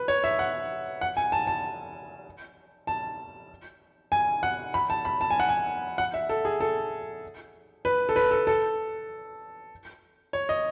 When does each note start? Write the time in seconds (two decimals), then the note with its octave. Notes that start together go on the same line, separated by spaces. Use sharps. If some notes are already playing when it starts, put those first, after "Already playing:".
Already playing: B4
0.08 C#5
0.24 E5
0.39 F#5
1.01 F#5
1.17 G#5
1.32 A5
1.47 A5
2.87 A5
4.12 G#5
4.43 F#5
4.74 B5
4.90 A5
5.05 B5
5.21 A5
5.31 G#5
5.40 F#5
5.49 G#5
5.98 F#5
6.14 E5
6.29 A4
6.45 G#4
6.61 A4
7.85 B4
8.09 A4
8.16 B4
8.31 A4
8.47 A4
10.33 C#5
10.49 D#5